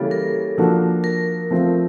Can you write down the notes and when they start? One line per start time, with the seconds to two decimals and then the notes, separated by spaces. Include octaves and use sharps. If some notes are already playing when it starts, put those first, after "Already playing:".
Already playing: C#3 E3 G3 A#3 C#4 A4
0.11 A#4
0.58 F3 A#3 D4 F#4 A4
1.04 A#4
1.50 F3 A3 C4 F4